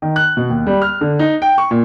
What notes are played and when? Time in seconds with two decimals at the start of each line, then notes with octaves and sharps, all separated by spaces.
0.02 D#3
0.16 F#6
0.37 B2
0.50 D#2
0.67 G3
0.82 F6
1.01 D3
1.19 D#4
1.42 G5
1.58 C#6
1.71 A#2